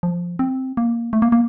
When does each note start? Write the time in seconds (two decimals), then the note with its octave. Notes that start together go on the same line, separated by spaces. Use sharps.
0.03 F3
0.39 C4
0.77 A#3
1.13 A3
1.22 A#3
1.32 A#3